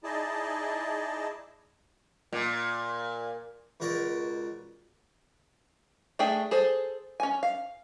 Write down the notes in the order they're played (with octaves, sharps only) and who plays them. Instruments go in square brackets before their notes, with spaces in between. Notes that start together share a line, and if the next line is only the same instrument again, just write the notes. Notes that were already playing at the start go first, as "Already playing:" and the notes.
[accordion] D#4 E4 G#4 D5 D#5 A5
[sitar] A#2
[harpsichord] C#2 B2 A#4 D5 C#6
[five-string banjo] A3 D4 G#4 G5
G#4 A4 C5
C#4 G#5
F5